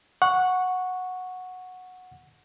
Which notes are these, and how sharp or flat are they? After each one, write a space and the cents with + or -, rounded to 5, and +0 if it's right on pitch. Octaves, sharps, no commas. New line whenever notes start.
F#5 -10 C#6 +0